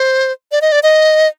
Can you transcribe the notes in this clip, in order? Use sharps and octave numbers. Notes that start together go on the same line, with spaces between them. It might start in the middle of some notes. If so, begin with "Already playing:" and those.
Already playing: C5
D5
D#5
D5
D#5